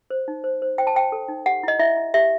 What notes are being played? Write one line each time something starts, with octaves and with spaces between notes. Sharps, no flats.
C5
D#4
C5
C5
C5 G5
A5
C5 G5
A4
D#4
G4 F#5
E4 D#5
E4 E5
E4
G4 E5